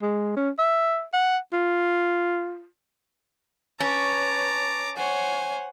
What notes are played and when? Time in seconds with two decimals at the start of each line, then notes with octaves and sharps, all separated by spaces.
0.02 G#3
0.37 C#4
0.59 E5
1.13 F#5
1.53 F4
3.80 C#4 B4 C#5 A5 A#5 D6
4.96 C5 C#5 F#5 G#5